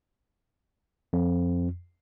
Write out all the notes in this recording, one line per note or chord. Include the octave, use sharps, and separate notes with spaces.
F2